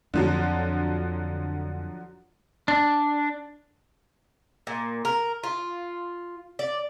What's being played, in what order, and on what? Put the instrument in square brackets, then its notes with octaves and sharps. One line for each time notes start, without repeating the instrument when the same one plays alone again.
[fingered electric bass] F2 [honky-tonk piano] D3 F3 F#3
[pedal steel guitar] D4
[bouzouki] A#2
A#4
F4
D5